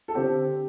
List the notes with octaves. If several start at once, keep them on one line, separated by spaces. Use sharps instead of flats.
A4
D3 C4 G4